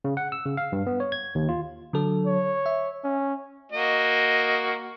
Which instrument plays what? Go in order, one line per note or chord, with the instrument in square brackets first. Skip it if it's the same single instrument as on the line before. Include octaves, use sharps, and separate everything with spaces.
[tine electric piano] C#3
F#5
E6
C#3
F5
G2
B3
C#5
G#6
D#2
F4
[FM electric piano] D3 F#3 A4
[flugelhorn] C#5
[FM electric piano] E5
[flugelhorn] C#4
[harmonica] A#3 F#4 D#5